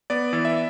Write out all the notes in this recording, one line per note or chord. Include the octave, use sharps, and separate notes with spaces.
B3 D5
E3
E5